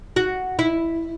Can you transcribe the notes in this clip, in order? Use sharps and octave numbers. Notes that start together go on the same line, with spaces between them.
F#4
E4